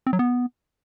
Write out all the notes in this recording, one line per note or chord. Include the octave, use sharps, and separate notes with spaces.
C4
F#3
B3